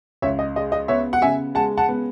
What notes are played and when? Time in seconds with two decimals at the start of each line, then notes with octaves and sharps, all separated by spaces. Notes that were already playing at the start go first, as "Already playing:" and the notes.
0.22 C#2 C#5 E5
0.39 D#5
0.56 G#3 D#5
0.72 D#5
0.88 B3 C#5 E5
1.13 F#5
1.22 C#3 E5 G#5
1.55 G#3 F#5 A5
1.77 F#5 A5
1.88 B3